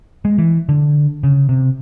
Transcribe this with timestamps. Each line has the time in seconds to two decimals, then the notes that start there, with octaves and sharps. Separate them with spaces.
0.25 G#3
0.38 E3
0.69 D3
1.23 C#3
1.49 C3